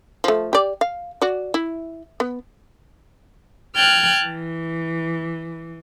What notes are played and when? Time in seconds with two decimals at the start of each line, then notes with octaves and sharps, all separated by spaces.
0.24 F3 A3
0.53 G4 D5
0.81 F5
1.22 F#4 D5
1.54 E4
2.20 B3
3.75 G5 A5 F6 F#6 G#6
4.23 E3